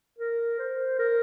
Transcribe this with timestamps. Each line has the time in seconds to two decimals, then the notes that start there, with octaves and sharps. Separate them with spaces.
0.18 A#4
0.59 C5
0.99 A#4